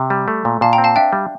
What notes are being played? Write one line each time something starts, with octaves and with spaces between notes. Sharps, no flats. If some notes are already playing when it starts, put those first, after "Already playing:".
Already playing: C3
G3
A3
A#2
A#2 F5 A5
G5 A#5
C4
F5 A5
D4 E5 G5
G3